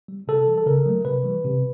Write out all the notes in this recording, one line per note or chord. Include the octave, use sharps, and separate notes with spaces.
G3
C3 A4
E3 G3
A4
C#3 A#4
F#3 A3
C3 B4
E3 G3
C3